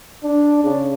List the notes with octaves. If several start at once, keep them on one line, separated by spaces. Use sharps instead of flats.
D4
C#3